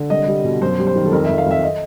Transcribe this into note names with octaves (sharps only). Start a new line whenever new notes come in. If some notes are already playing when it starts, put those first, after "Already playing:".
Already playing: D3
C2 D#5
G3
B2
F#2 C5
G3
C5
D#3
A4
F2 A#4
E5
F2
F5
F2 E5
D#5